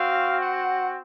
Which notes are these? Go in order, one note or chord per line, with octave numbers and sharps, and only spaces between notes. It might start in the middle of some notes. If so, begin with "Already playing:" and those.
Already playing: C4 F#4 F5
F#5